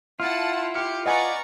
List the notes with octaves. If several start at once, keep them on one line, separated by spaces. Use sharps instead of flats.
E4 F4 F#5 A5 F6
G4 F6 C#7
B4 D5 D#5 F#5 G#5 A#5 C#6